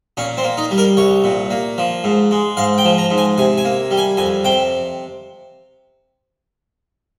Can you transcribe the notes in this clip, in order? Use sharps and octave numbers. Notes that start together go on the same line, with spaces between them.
A#2 C#4
C4
A#3
D#4
G3
A#4
C2 C#5
A#2
A#3
F3
G#2
G#3
G#2 F5
G5
F3
A#5
G#2
G#5
C3 G#5
G#5
A#3
G3
G#5
F2 G#5
C3 G5